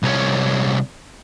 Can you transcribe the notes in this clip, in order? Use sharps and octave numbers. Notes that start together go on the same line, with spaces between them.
C2 C#4